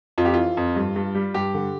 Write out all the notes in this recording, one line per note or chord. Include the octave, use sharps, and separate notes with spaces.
F2 F4
G4
E3 F4
F2
G2
G2
G3
G2 G4
D3